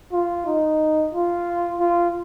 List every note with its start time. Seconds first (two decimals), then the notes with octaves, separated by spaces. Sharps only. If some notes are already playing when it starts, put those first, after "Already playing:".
0.13 F4
0.46 D#4
1.13 F4
1.78 F4